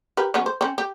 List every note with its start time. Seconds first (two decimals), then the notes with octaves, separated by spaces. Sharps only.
0.17 G4 A#4 B4
0.34 F#3 B3 C#4
0.46 C5
0.61 C4 C#4
0.78 G4